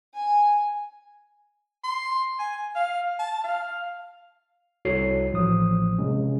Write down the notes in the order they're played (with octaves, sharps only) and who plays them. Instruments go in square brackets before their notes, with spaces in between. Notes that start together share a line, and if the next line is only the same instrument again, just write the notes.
[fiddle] G#5
[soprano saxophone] C6
G#5
F5
A5
F5
[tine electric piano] C2 E4 F#4 A4 C#5 C7
A1 F3 D#6
C3 G#3 C#4